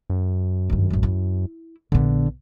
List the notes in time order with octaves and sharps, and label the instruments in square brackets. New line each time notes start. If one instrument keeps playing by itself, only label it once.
[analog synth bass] F#2
[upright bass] G2 D#3
A1 G#3
E4
[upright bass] A#1 B3 [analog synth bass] D3